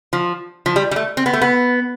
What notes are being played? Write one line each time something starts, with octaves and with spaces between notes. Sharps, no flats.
F3
F3
G3
G3
A3
C4
B3
A3
B3